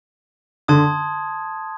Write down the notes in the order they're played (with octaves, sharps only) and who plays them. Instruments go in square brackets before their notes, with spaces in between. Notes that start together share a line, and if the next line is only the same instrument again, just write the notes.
[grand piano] D3 [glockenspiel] A5 C6 D#6 G#6